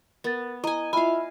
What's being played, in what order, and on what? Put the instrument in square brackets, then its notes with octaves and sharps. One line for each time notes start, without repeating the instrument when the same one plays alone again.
[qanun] B3 [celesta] A#4 A6
[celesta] E4 A#5 [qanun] D#5 G#5
[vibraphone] E4 F4 E5 [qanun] F5 G#5 [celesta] B5